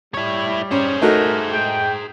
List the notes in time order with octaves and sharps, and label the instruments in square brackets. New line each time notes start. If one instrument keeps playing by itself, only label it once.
[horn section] G3 [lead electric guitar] E4 C#5
[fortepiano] C#4 [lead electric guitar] G#4 C5
[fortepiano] A3 D#4 F#4 [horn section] A#4
[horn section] G#3 G5